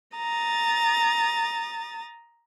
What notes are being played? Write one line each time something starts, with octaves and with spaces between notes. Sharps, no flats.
A#5 D#6 A6